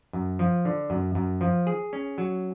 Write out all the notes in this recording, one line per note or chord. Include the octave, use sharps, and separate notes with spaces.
F#2
F3
D3
F#2
F#2
F3
G#4
C#4
F#3